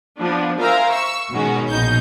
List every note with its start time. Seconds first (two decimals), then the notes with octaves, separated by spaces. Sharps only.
0.18 F3 B3 D4
0.58 A#4 C5 E5 F5 G#5 A#5
0.89 C#6 E6
1.30 B2 D#3 G#3 C#4 F#4
1.69 A#1 B2 D#4 G6